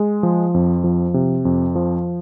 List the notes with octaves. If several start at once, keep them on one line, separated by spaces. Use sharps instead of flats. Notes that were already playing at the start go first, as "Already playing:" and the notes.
Already playing: G#3
F3
F2
F3
C3
F2
F3